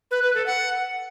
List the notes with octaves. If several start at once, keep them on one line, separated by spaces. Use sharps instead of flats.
B4
B4
A4
F#5